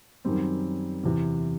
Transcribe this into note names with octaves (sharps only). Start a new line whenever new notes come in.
F#2 D#3 G3 C4
E2 C3 E3